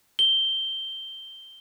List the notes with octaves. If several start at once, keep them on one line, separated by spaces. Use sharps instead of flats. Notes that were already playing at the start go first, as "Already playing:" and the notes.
G7